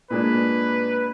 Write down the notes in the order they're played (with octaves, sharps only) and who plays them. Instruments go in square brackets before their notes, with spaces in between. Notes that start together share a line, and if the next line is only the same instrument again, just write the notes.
[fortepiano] A#2 G#3 D4 [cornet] B4